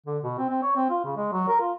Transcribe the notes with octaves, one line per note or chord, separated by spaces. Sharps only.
D3
B2
C4
C4
C#5
C4
F4
C#3
G#3
F#3
A#4
F4